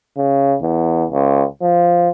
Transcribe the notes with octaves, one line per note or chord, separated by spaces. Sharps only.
C#3
E2
C#2
F3